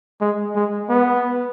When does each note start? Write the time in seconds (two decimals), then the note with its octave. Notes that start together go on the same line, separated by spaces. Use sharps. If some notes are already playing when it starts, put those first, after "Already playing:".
0.21 G#3
0.56 G#3
0.89 B3